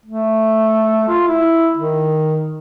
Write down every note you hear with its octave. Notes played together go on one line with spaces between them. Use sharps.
A3
F4
E4
D#3